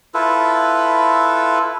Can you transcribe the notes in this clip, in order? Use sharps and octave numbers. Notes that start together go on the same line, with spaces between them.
E4 F4 A4 B4